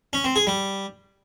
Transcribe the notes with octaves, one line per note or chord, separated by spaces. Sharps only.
C#4
C4
G#4
G3